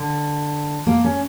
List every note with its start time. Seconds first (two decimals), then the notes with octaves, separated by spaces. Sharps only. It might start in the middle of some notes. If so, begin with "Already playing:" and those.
Already playing: D3
0.87 A#3
1.04 C#4